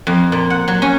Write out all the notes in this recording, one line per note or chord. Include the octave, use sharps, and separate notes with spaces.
F2
A#2
F#5
F#3
C#4